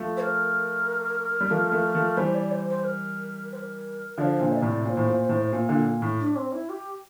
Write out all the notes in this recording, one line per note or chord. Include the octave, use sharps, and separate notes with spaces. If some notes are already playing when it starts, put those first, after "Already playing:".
Already playing: F3 A3
C5
A#4
G3
F3 A3
F3 A3
F3 A3
E3 G3 C5
D5
C5
C5
A#4
C5
A#4
D3 F3 C5 D5
A#2 D3
E5
D5
A2 C3
A#2 C5 D5
A2
A#2
A2
A#2
A#2 D3
A#2
A2
D4
C4
E4
G4